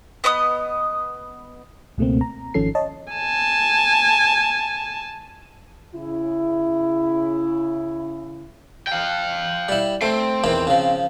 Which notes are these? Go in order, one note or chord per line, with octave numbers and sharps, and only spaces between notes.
B3 D#5 C#6 D#6
C#2 B2 A3 A#3 C4
A#5
G#1 D#3 F3 C#4 A4 C7
C#5 D#5 A5
G#5 A5
C#3 E4
F5 G5
G3 E4
A3 C4
E2 D#3 E3
C#3 F3